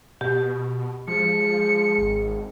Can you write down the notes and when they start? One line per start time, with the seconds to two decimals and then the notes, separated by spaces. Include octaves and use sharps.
0.21 B2 G4
1.08 F3 G#3 C#7
1.98 G#1